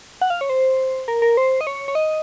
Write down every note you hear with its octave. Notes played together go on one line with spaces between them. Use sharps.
F#5
F5
C#5
C5
A#4
A#4
C5
D#5
C#5
C#5
D#5